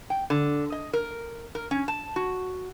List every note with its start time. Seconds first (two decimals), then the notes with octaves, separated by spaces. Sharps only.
0.10 G5
0.30 D3
0.72 D#5
0.93 A#4
1.55 A#4
1.71 C#4
1.88 A5
2.16 F#4